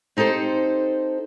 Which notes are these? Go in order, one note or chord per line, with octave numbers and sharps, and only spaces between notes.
C4 D#4 G4 A4 C5